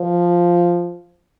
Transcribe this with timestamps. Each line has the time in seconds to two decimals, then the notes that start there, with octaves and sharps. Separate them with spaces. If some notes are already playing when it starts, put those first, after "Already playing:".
Already playing: F3